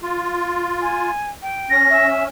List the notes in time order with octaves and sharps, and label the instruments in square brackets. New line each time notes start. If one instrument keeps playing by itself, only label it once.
[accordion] F4
[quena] G#5
G5
[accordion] C#4 [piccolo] A#6
[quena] E5